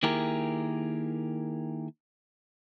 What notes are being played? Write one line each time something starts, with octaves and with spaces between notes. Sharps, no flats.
D#3 A#3 E4 G4 G#4 A#4